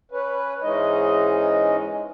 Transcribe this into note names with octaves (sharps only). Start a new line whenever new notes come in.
C#4 B4
G#2 E3 G#3 C#4 D#4 D#5